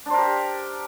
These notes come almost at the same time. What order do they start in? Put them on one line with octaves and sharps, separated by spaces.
D4 C5 A#4 G4